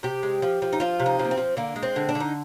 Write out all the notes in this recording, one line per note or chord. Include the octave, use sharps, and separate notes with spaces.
C3 G4
G#3
F3
F3
D#4
F3 F4
C3
D#4
F3
A#3
C4
F3
D3 A#3
G#3
C4
D3
D4
D3
D#4